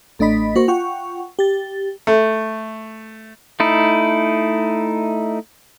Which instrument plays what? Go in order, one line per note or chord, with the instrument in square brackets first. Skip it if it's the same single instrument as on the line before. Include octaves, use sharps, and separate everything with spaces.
[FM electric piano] A1 A3 D4 D#5 B5 B6
A#3 F#4 C5 C#6
F4 F#5 G5 C#6
G4 A6
[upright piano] A3
[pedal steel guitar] A3 D#4 E4